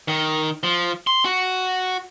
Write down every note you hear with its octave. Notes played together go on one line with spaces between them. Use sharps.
D#3
F3
C6
F#4